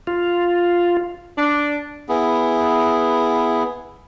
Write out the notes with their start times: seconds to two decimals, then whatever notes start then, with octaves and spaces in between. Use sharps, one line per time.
0.07 F4
1.37 D4
2.09 B3 E4 G#4